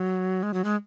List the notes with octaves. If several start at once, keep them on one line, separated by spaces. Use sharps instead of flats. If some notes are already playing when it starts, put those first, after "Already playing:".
Already playing: F#3
G#3
F#3
G#3